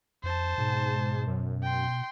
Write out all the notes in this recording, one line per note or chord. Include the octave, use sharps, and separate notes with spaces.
F2 C5 A5
G#2 B2
F#2
G5 C6